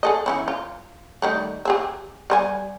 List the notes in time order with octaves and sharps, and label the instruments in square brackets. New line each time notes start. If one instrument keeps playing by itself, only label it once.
[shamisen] G#4 A4 D#5
E3 C#4 E4
F4
D#3 G3 A3
G4 G#4 E5
G3 C5 G#5